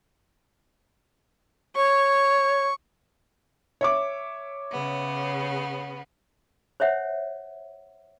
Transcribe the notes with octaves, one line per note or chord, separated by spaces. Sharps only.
C#5 C#6
C#5 E5 D6
C#3 B3
C5 C#5 E5 F#5